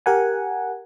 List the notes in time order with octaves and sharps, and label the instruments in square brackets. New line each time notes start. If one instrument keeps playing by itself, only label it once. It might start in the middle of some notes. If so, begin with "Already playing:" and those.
[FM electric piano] G4 A#4 F#5 G#5